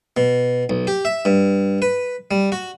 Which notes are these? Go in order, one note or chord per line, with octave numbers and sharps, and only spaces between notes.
B2
B1
G4
E5
G2
B4
G3
F#4